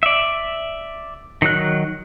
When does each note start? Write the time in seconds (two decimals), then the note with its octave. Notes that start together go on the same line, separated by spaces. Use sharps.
0.03 D5 E5
1.42 D#3 F#3 F#6